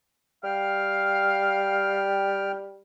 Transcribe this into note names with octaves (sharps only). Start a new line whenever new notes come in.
G3 F5 G5 F6